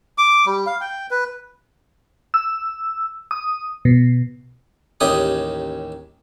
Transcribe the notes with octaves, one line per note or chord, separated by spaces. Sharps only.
D6
G3
F5
G5
B4
E6
D#6
B2
A1 D#2 C#4 G4 G#4 D#6